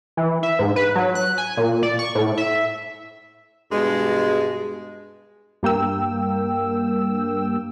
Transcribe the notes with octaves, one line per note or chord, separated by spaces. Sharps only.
E3
E5
G#2
B4
F#3
F#6
G#5
A#2
D5
C#6
A2
E5
G2 B2 G#3
G2 A#3 G5 E6